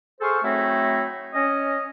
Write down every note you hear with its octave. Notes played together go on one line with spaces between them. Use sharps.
G#4 A4 C5 F5 C#6
F#3 A3 C4 D#4 E4
C#4 D#5